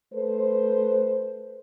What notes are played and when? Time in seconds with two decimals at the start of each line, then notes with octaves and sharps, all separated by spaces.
0.14 A3 A4 B4 C5